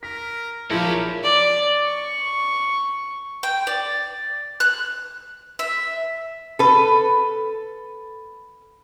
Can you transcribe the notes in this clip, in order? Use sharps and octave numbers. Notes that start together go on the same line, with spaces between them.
A#4 B6
A#1 F3 E4 F4 G4 A#4 C#5 A5
D5
C#6
G5
D5
F#6
E5
A4 B4